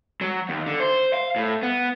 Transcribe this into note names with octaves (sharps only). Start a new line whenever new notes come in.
F#3
D#2
D3
C5
F5
A2
B3